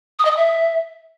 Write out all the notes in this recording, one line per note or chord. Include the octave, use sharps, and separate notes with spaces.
D#6
D#5
D#6
E5